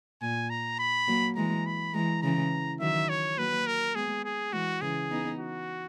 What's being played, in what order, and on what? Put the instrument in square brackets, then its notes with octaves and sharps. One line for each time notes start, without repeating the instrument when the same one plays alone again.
[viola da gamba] A#2 [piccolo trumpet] G#5
[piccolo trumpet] A#5
B5
[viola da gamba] F#3 A#3
[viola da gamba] E3 G#3 [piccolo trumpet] A#5
[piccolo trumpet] B5
[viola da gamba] E3 G#3 [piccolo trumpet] A#5
[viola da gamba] C#3 E3 [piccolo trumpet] A#5
[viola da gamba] D#3 F#3 [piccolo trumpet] E5
[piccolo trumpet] C#5
[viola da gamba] F#3 A#3 [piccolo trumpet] B4
[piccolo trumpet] A#4
[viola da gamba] G#3 B3 [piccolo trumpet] G#4
[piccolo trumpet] G#4
[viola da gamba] E3 G#3 [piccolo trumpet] F#4
[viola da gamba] C#3 E3 [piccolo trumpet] G#4
[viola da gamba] B3 D#4
[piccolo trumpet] F#4